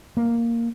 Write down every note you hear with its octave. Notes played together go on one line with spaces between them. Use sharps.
A#3